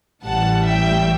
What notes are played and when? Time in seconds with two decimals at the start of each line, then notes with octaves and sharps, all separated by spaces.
0.23 A1 A2 E3 G3 F#5 A5
0.66 E5 G5